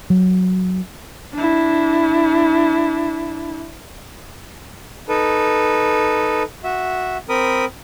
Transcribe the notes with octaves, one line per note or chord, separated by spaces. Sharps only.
F#3
D4 E4
D#4 A4 B4
F#4 E5
C4 A#4 B5 D#6